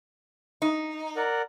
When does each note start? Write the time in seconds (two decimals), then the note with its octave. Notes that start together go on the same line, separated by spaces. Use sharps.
0.62 D#4
1.16 A#4 D5 F#5